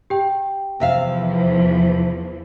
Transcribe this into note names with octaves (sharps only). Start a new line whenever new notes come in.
G4 G5
E2 C3 E3 F3 E5 F5